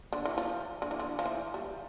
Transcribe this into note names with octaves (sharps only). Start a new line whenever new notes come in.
D3
E3
F3
D3
E3
D3
F3
E3
G3